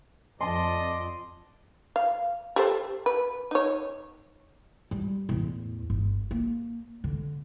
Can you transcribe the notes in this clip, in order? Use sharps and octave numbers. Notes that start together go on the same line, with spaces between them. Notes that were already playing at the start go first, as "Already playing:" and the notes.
F2 D5 D#5 A5 C6
F5
G4 A4 C5
B4
D#4 C#5
G3
E2 A2
G1
A#3
D3